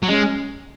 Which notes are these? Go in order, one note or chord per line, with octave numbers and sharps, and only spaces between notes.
F#3
G#3 C#4